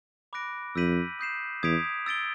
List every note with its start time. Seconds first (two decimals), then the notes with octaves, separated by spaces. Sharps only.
0.33 B5 D6 F#6 A#6 D7
0.76 F2 E6 G6 B6 D#7 F#7
1.19 D#6 G6 C7 E7
1.63 E2 D#6 G#6 B6 D7 F7
2.06 E6 A6 D7 G7